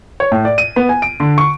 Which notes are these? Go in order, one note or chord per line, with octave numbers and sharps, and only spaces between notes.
C#5
A2
D5
D#7
B3
G#5
D7
D3
C#6